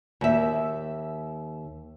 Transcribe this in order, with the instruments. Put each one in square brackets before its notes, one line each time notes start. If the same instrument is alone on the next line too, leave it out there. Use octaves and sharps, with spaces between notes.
[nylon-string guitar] D#2 E5